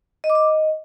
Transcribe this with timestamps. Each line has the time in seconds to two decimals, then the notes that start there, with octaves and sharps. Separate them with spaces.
0.24 D#5
0.30 D6
0.35 D#5